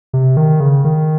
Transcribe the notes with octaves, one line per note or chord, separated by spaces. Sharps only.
C3
D#3
C#3
D#3